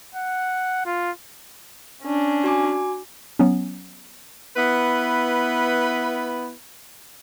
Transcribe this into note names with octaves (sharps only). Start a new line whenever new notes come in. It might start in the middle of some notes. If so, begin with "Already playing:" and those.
F#5
F4
C#4 D4
F#4 G#5 D6
F#3 B3 C#4
B3 E4 B4